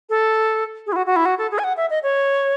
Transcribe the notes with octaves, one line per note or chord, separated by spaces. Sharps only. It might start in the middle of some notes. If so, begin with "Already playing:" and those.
A4
G#4
E4
F#4
F#4
E4
F#4
A4
G#4
G#5
F#5
E5
D#5
C#5